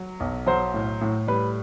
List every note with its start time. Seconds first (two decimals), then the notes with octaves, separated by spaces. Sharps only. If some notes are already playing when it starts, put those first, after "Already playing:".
Already playing: F#3
0.20 B1
0.47 F#3 C5
0.74 A2
1.01 A2
1.28 G3 B4